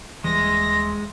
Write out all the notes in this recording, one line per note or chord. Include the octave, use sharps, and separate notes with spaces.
D#1 E3 G3 G#3 E5 C6 A#6